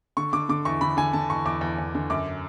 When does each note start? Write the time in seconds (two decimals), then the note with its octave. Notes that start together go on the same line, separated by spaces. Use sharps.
0.17 D3 C#6
0.33 D3 D6
0.49 D3 D6
0.65 E2 C#6
0.81 D3 B5
0.97 D3 G#5
1.13 D3 A5
1.30 E2 C#6
1.46 E2 D6
1.61 E2
1.78 E2
1.95 D3
2.10 F#2 D6